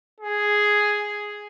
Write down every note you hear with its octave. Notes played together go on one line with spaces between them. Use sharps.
G#4